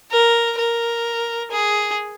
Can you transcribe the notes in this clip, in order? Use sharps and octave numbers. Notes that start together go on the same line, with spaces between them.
A#4
A#4
G#4